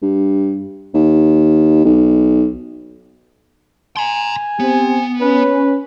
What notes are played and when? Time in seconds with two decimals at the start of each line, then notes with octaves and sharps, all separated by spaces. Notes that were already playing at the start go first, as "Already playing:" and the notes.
0.02 G2
0.94 D#2
1.85 B1
3.97 G#5 A#5 C6
4.60 B3 C4 G4
5.21 C#4 B4